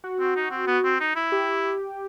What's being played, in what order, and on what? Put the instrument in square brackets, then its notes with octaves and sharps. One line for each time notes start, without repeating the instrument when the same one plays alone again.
[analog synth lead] F#4
[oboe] C4
D#4
C4
B3
C4
D#4
E4
[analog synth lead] G4